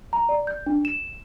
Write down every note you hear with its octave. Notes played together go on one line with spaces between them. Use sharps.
A#5
D5
G6
D4
E7